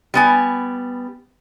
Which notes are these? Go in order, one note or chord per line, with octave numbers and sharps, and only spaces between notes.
G3 B3 G#5